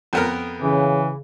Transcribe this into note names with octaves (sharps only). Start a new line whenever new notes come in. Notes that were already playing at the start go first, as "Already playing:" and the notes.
F2 B3 A#4
C#3 E3